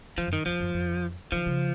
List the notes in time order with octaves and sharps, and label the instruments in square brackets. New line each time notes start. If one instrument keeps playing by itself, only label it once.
[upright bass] D#3 [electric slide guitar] F3
[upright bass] F#2
[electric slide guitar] D#3
[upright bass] F2 [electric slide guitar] F3
[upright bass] F#2
F2
[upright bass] D#3 [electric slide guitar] F3
[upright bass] C#3